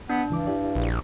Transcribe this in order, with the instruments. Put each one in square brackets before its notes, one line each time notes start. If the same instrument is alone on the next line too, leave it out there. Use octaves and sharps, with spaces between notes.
[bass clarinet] B3 [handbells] D4
[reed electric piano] C#2 E3 D6 [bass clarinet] G2
[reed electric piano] E4 G4 D5
[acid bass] A#1